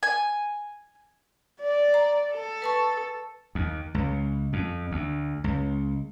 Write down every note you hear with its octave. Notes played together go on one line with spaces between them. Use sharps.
G#5
D5
A#5
A4
B4 A5 C#6
D#2
C#2
F2
D2
C#2